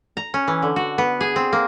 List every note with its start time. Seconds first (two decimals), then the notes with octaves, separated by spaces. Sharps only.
0.17 A#5
0.34 C#4
0.48 E3
0.62 D3
0.76 F#4
0.98 B3
1.21 G#4
1.36 C4
1.53 A#3